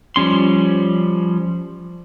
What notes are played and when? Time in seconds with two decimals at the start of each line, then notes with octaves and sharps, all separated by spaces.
0.16 F3 G3 C#4 C6